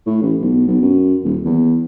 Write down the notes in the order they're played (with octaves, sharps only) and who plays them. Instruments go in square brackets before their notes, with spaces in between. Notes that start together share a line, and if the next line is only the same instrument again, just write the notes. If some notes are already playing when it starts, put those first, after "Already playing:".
[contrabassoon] A2
A1
B1
B1
F#2
D#1
E2